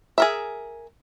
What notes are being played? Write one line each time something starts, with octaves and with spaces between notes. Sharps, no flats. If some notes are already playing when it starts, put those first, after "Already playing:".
G#4 A#4 E5